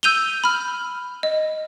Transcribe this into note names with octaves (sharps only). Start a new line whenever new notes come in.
E6 G6 D#7 F7 G7
B5 F6
D#5